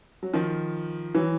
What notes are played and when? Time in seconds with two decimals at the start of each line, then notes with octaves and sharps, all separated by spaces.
0.23 F#3
0.33 D#3 F3
1.14 E3 F#3